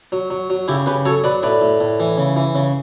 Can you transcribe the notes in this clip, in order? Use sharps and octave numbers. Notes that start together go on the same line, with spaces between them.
F#3
F#3
F#3
C#3 E4 G4
C#3 G4 B4
F#3 A4 C#5
F#3 B4 D5
A2 B4 D5
A2
A2
E3
C#3
E3
C#3